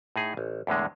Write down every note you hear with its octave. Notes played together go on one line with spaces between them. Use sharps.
A2 D#4 G#4
A1
E2 A2 D3 G#3